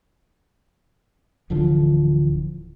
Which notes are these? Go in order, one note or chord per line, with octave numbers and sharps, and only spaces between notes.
D1 D3 E3 F3